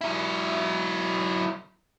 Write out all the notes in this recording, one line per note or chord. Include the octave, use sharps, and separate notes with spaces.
F#3 E4